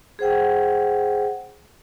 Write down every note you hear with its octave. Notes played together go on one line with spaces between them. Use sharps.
G#4 C5 F#5 G5